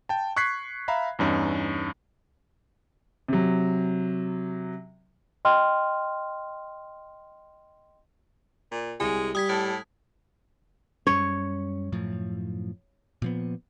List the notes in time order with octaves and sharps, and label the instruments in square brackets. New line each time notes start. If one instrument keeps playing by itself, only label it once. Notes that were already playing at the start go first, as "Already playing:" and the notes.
[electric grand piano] G5 A5
C#6 F#6 G#6 B6 C7
E5 F5 A#5 B5
E2 G2 C#4 D#4
[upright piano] C3 F#3
[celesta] D#5 G5 C6 F6
[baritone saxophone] A#2
[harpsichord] C2 [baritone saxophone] G#3 [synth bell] G#5
[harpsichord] G3 [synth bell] D#6 G#6 B6
[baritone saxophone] A2 [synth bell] A5
[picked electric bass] F#2 G3 C#4 [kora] C#5
[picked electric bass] F#2 A2 F3
A#2 F3 B3